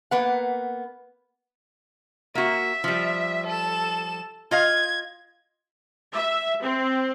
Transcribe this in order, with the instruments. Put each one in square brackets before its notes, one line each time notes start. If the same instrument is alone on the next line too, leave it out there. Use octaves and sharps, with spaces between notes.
[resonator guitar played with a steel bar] A#3 B3 F#5
[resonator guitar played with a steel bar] A#3 F#4 [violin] E5
[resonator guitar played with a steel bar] F3 G3
[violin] A4 E7
[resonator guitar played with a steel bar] F4 D#5 F5 [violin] G#6
[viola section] E5
C4